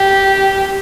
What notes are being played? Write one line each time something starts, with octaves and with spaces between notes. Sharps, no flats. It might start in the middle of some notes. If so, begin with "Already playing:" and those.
Already playing: G4